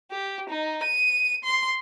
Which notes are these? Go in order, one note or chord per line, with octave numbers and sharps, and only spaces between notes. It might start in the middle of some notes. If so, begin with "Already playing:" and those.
G4
D#4
D#7
C6